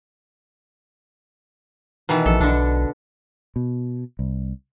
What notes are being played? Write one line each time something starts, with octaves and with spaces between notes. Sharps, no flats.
B2 D#3 E3
A#1 A4
B1 D3 D4
B2
C2